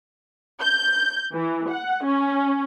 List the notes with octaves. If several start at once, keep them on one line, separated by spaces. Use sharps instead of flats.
G6
E3
F#5
C#4